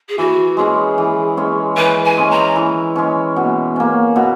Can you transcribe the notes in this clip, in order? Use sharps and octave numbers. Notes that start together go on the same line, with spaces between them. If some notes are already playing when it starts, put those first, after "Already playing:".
G#4
E3 F#4
G#3 C#4 G#4
E3
G#3 C#4
E3 B4
G#5
G#3 C#4
A#5
E3
G#3 C#4
B2
A#3 C#4
B2